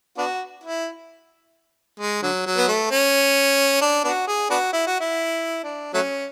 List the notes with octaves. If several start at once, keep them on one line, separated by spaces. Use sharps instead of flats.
B3 D4 F#4
E4
G#3
D3 F#3
F#3
B3
A3
C#4
D4
B3 D4 F#4
G#4
B3 D4 F#4
E4
F#4
E4
D4
F#3 A3 C#4